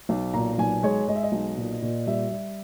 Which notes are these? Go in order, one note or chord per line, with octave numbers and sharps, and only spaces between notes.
B1
A#2 A#5
B1 G#5
G#3 C#5
G#3 D#5
E5
D#5
B1
A#2
A#2
G3 E5
G3